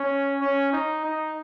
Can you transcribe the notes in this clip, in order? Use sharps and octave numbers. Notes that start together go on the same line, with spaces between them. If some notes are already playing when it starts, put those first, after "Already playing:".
Already playing: C#4
C#4
D#4
D#4